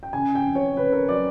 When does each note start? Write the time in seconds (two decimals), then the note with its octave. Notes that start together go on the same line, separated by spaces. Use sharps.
0.03 G5
0.13 C#3 G#5
0.35 G5
0.46 F2
0.55 C#5
0.77 C#3 B4
0.92 A#4
1.09 F#3 D5